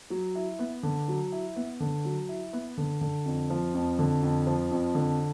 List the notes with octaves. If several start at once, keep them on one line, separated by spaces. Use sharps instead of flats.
F#3
E4
B3
D3
F#3
E4
B3
D3
F#3
E4
B3
D3
D3
F2
F3
F2
D3
F2
F3
F2
D3